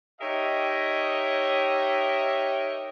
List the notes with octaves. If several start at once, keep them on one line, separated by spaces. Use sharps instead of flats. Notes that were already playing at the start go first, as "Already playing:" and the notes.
D#4 G4 A#4 C#5 D#5 E5